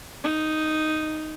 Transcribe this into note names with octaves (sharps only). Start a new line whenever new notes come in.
D#4